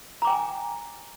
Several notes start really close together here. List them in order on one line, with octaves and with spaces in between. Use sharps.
A#5 D6 G5 G#5